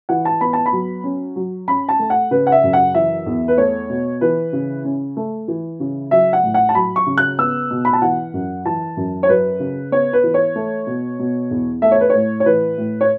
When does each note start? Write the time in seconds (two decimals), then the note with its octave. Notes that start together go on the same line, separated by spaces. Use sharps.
0.09 E3 F#5
0.25 A5
0.41 B3 B5
0.53 A5
0.66 B5
0.72 F#3
1.04 C#4
1.36 F#3
1.68 C#4 B5
1.89 A5
1.99 A3
2.10 F#5
2.31 C#3 B4
2.47 F#5
2.52 E5
2.63 F#2
2.73 F#5
2.95 E3 E5
3.26 E2
3.48 B4
3.58 A3 C#5
3.90 B2
4.21 E3 B4
4.53 C#3
4.85 C#4
5.17 A3
5.48 E3
5.80 C#3
6.11 F#3 E5
6.33 F#5
6.43 A2
6.54 F#5
6.69 A5
6.75 F#3 B5
6.96 C#6
7.07 C#3
7.18 F#6
7.39 B3 E6
7.71 B2
7.85 B5
7.93 A5
8.02 E3 F#5
8.33 F#2
8.65 E3 A5
8.97 F#2
9.23 C#5
9.29 F#3 B4
9.60 C#3
9.92 B3 C#5
10.13 B4
10.24 E3
10.34 C#5
10.56 A3
10.87 B2
11.19 B2
11.51 E2
11.82 A3 E5
11.92 C#5
12.01 B4
12.10 A2 C#5
12.40 C#5
12.46 E3 B4
12.78 A2
13.01 C#5